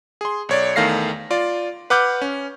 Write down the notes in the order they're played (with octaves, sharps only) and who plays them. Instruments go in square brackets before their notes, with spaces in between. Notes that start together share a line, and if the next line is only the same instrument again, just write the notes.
[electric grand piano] G#4 C6
B1 C#5 D5
E2 D#3 A3 F5 A#6 C7
F4 D5
B4 F#5 D6 F6 G6
C#4